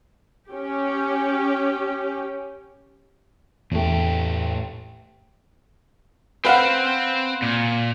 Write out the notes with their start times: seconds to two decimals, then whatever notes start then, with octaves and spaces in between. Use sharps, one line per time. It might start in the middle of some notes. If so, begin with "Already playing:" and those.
0.49 C#4 G4
3.72 E2 A2 A3 G4
6.45 C4 B4 C5 F5 F#5
7.42 A#2